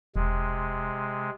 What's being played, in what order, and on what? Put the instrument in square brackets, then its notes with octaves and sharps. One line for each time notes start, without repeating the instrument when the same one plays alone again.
[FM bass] E1 [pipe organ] C3 G#3